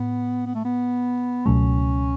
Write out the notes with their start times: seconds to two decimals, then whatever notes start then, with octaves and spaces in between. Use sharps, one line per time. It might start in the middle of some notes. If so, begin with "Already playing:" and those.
Already playing: A2 B3
0.46 B3
0.55 A3
0.65 B3
1.46 C#2 B2 F#3 A3 C#4